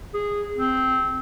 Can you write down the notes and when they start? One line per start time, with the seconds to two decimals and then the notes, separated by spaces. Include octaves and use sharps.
0.14 G#4
0.57 C4